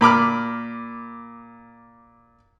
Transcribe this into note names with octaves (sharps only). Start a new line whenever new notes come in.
A#2 B5 D6 F6